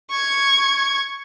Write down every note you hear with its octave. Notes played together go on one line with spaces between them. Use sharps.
C#6 G#6